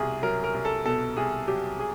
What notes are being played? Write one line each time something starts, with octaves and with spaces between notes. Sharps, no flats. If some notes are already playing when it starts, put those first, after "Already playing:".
Already playing: C2 B2 G#4
F#3 A#4
A#4
C2
A4
B2 A4
C2 G#4
F#3 G4
G#4